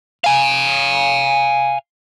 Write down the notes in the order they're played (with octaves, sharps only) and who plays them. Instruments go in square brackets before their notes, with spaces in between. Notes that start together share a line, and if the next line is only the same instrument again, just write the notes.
[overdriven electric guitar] F5 G#5